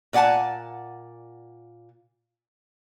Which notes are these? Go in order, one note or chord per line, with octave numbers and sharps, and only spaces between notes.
A#2 D5 F#5 G#5 A5